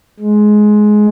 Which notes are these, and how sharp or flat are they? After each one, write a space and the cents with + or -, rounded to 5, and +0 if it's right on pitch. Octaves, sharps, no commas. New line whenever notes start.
G#3 +15